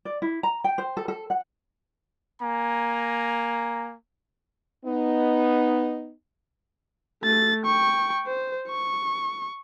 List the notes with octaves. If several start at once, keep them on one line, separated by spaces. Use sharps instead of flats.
D5
E4
A#5
G5
C5
A4
A4
F#5
A#3 G#5 A#5
B3 D#4
A3 A6
G5 C#6
C5
C#6